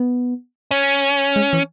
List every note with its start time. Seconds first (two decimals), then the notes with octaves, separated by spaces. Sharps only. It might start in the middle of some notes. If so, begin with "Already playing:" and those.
Already playing: B3
0.71 C#4
1.36 G#3
1.53 E3